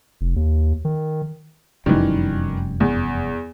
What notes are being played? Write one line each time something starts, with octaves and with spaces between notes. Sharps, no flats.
F1
D#2
D#3
F1 F#2 D#3 E3 G3
E2